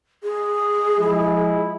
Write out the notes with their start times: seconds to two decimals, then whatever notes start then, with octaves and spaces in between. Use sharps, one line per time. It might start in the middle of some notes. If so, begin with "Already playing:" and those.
0.24 G#4
0.99 F3 G#3 E4